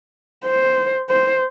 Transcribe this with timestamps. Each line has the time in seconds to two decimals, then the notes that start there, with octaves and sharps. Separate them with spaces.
0.45 C5
1.10 C5